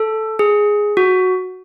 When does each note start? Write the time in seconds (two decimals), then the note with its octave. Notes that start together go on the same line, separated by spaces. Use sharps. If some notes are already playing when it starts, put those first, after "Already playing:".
Already playing: A4
0.39 G#4
0.97 F#4